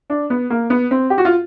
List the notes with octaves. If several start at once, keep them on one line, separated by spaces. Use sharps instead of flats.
D4
B3
A#3
B3
C4
G4
F#4
F4